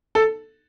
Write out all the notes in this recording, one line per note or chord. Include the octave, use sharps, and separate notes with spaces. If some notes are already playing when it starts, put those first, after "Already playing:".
A4